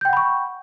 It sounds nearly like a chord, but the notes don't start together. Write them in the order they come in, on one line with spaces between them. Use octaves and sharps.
G6 G5 F#5 B5 C#6